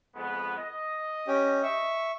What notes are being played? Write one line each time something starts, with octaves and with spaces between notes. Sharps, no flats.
F2 G#3 B3
D#5
C#4 G4
E5 C#6